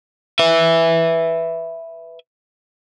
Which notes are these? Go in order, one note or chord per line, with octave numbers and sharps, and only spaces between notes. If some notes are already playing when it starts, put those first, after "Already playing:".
B4 E5